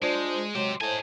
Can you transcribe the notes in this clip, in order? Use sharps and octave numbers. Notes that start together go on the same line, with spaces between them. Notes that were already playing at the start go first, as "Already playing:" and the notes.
G#3 D4 F4 C5
F#3 G#3 G4 C5
A2 D#4 C5 G#5 A5